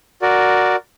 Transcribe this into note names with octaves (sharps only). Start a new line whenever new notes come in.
F#4 A#4 D5